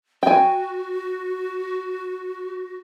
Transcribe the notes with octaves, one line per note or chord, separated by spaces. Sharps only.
F#4 G5 G#5